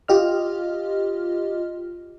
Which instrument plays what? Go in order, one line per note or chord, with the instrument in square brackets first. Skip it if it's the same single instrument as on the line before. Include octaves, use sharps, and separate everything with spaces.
[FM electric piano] F4 G4 D#5 F6